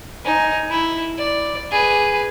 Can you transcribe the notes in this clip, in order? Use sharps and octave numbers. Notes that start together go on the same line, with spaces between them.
D#4 G#5
E4
D5
G#4 B4